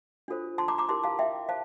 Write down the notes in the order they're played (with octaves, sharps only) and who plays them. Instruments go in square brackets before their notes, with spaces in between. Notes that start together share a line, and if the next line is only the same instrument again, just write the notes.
[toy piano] D4 F4 A4 C5
A5 C6
A#5 D6
A#5 D6
E4 G4 A#4 A5 C6
F5 A5
E5 G5
C5 F5 A5